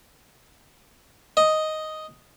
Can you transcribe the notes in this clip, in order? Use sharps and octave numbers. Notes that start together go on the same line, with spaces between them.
D#5